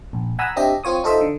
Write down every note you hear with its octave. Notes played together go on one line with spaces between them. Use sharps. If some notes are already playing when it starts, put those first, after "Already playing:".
A#1
F#5 G#5 A#5 B5 D#6 E6
C4 D4 G4 D#5 E5
C4 F4 C#5 D#6
D#4 F4 A4 C5 D#5 E5
D3